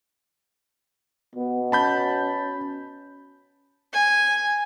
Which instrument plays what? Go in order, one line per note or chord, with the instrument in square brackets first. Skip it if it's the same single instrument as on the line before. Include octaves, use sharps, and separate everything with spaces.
[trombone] B2 [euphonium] B3
[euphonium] C#4 [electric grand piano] A5 B5 G6
[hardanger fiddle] G#5